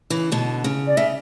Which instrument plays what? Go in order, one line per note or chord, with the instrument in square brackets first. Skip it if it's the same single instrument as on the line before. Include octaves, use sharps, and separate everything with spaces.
[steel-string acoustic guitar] C#3 E3
B2 D3
C#3
[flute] D5
[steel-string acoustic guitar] C#3 [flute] E5